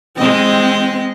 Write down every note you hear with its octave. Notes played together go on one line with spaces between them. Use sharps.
G#3 C4 D#5